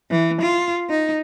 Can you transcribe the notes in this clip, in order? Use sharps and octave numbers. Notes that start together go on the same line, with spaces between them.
E3
F4
D#4